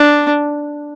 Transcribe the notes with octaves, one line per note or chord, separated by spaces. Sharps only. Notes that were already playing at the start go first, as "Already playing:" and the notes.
Already playing: D4